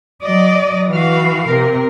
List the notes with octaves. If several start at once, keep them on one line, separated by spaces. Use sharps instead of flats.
F#3 D5 D#5
E3 F#4 F5
C3 A#4